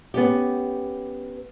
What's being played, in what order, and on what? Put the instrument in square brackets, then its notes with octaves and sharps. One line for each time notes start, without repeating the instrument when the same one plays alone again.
[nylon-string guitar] B3 C#4 G4